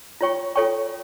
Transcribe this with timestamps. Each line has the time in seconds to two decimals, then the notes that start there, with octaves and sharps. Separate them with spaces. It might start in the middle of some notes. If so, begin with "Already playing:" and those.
0.21 F4 C#5 G5 C#6
0.55 F4 A4 C#5 G5 C#6